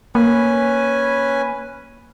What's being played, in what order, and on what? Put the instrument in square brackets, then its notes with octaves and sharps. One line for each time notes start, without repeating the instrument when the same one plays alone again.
[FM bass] A#3 [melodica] C#4 B4 G#5